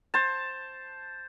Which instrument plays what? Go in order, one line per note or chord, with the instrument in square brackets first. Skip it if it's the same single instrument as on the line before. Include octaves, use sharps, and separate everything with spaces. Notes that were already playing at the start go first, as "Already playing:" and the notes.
[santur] C5 A5